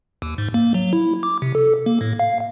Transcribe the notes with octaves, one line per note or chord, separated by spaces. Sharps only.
D#2
G#2
A#3
F#3
E4
D6
C3
A4
A#3
A2
F5